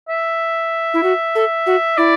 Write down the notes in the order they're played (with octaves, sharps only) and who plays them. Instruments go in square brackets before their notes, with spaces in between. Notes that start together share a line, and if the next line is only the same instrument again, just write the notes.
[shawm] E5
[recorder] E4
F#4
A4
F#4
[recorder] E4 [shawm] D5